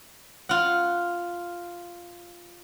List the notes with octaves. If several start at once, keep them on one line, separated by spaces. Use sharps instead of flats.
F4 F#5